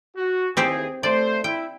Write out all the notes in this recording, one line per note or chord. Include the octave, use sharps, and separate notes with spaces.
F#4
D#2 E3 C4 G4 G#4 C5
A3 C5 D5
E4 G5